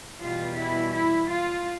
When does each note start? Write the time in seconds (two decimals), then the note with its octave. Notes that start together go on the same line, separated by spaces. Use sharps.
0.21 E2 B2 G3 F4
0.57 E4
0.93 E4
1.30 F4